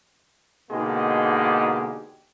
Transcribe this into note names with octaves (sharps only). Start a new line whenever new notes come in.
B2 D3 G#3 A#3 D#4 G4